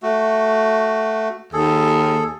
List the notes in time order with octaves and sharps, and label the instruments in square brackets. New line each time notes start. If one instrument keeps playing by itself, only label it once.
[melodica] A3 F#4
[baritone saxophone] D#2 [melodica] G#4 A4